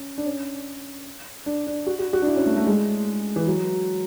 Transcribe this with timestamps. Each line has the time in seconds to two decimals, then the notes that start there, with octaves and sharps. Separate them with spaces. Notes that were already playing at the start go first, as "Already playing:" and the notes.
Already playing: C#4
0.18 D4
0.26 C#4
1.46 D4
1.67 D4
1.86 F#4
1.99 F#4
2.13 F#4
2.22 D4
2.27 E4
2.36 C#4
2.46 A3
2.57 A3
2.67 G#3
3.36 E3
3.47 F#3